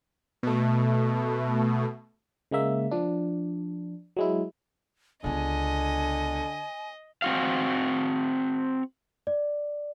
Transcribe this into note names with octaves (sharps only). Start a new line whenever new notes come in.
B2 A3
C#3 G#3 A#3 E5
F3 D4
F#3 G#3 E4
C#2 D3 B3 D#5 G#5
C4 F#4 F5
D5